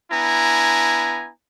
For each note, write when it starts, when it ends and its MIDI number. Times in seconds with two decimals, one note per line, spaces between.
0.11 1.29 59
0.11 1.29 62
0.11 1.29 64
0.11 1.29 80
0.11 1.29 82